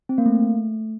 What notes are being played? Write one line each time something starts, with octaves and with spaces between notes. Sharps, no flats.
C4
A#3
A3